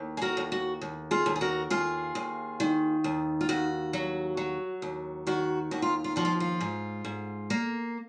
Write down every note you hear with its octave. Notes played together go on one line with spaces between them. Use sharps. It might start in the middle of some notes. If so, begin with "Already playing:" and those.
Already playing: D#2
G#4
F#4 A#4
D#2
F#4
D#2
F4 G#4
D#2
G#4
F#4 A#4
D#2 F4 G#4
D#2
D#3
D#2
F4
D#2 F#4
F#3
F#3
D#2
D#3 F#4
D#2 F#4
F4
F4
F3 F#4
F4
F4
G#2
G#2
A#3